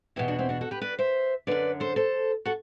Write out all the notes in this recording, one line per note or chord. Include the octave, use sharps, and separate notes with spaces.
E2 B2 E4 G4
D4 F#4
C4 E4
D4 F#4
F#4 A4
G4 B4
B4 D5
C5 E5
F#2 D3 B4 D5
A4 C5
A4 C5
F#4 A4